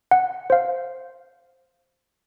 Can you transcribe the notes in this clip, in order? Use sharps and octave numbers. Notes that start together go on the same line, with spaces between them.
F#5
C5 F5